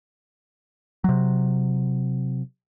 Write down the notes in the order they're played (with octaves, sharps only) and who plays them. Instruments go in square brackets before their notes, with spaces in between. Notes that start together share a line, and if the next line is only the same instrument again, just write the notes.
[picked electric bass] C3 F#3